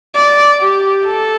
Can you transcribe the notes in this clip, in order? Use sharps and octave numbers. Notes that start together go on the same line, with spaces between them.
D5
G4
A4